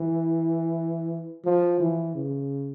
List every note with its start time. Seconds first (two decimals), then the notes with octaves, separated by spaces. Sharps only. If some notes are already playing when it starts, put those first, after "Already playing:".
Already playing: E3
1.45 F3
1.81 E3
2.16 C#3